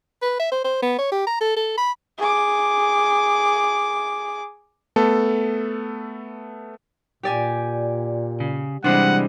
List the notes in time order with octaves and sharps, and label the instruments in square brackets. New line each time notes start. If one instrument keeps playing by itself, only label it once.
[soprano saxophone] B4
E5
C5
C5
B3
C#5
G4
A#5
A4
A4
B5
[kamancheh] G#4 D6
[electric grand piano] A3 B3 A4
[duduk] A#2 [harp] G4 D5 G#5
[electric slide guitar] C#3
[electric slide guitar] C3 E3 G#3 [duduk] G3 [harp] D4 C5 [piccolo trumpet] F#5